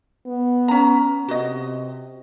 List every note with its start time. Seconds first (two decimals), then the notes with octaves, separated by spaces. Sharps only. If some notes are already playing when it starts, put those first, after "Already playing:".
0.26 B3
0.68 C#4 A#5
1.28 C3 F#4 D#5